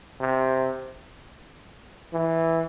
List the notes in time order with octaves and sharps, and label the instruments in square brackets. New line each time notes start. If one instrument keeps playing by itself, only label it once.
[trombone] C3
E3